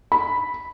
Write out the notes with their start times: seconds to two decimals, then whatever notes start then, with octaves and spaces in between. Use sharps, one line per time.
0.12 B5